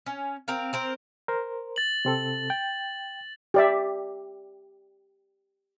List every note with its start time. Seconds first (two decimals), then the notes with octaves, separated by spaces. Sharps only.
0.06 C#4
0.48 C4 A#4 F5
0.73 C4 A#4 C5
1.28 A#4 C5
1.76 A6 F#7
2.05 C3 C4 A4
2.50 G5
3.54 G4 D5 E5